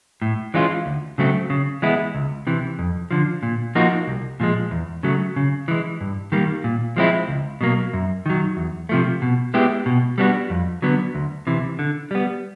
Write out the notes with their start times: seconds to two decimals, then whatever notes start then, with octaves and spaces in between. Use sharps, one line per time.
0.22 A2
0.54 E3 G#3 C#4 F4
0.86 D2
1.18 C#3 F#3 A3 C4
1.50 C#3
1.82 E3 G#3 B3 E4
2.15 C#2
2.47 C3 E3
2.79 F2
3.11 D3 F3
3.43 A#2
3.75 F3 A#3 D#4 F#4
4.08 C2
4.40 A#2 F3 G#3
4.71 E2
5.03 C#3 F#3 A3
5.36 C#3
5.68 E3 G#3
6.01 G2
6.32 D#3 G3 A#3
6.64 A#2
6.97 F3 G#3 C4 E4
7.28 C#2
7.61 B2 F#3 A#3
7.93 F#2
8.26 D#3 F#3
8.57 E2
8.89 C3 F3 A3
9.22 B2
9.54 G#3 B3 E4 G4
9.86 B2
10.18 G3 B3 D4 F#4
10.50 F2
10.82 D3 F#3 B3
11.15 D2
11.47 C3 E3
11.79 D3
12.11 G3 B3